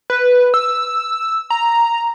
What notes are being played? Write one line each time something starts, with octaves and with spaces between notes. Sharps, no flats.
B4
E6
A#5